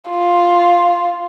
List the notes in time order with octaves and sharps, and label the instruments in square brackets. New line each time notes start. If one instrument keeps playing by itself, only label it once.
[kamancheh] F4